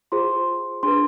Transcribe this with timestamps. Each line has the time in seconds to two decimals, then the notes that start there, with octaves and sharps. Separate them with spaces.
0.12 F4 G#4 C5 C6
0.83 D4 G#4 B4 C6